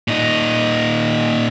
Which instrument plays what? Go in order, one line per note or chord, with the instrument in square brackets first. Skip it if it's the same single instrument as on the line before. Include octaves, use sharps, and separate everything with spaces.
[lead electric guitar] A#2 D#4